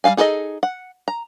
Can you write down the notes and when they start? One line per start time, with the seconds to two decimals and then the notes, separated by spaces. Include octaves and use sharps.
0.04 G3 A4 F5 G#5
0.17 D#4 G#4 A4 C5 D#5
0.63 F#5
1.08 A#5